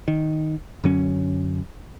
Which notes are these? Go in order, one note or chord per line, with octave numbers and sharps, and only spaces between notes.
D#3
F#2 D3 F#3 C#4